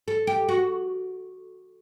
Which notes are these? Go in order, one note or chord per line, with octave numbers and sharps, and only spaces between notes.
A4
G4
F#4